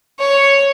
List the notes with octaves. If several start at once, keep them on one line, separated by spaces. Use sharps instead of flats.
C#5